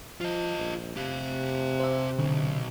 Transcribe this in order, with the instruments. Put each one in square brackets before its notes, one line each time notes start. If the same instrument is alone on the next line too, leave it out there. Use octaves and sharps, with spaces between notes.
[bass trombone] F3 [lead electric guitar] F4 D#5
[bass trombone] A#1
[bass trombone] C3 [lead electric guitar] G4 F5
[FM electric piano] C5 E5
[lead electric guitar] B1 [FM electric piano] D3